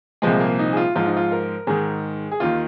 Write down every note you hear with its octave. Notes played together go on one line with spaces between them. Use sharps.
C2 A#2 F3 G#3
A#3
D#4
G#4
F4
G#2 F3 F4
D#4
F4
A#4
G#2 D#3 G#4
G#4
D#2 D#3 F4